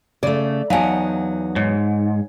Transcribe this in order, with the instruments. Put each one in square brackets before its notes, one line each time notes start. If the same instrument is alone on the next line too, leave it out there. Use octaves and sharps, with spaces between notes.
[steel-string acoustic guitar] C#3 A3 [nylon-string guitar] D5
[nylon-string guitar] E2 F#3 [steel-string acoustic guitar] D#4 F#5 [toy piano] F5 G#5 A5
[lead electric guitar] G#2 [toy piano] C#5